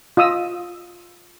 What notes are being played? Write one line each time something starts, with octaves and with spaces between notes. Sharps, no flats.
F4 D#5 D#6 E6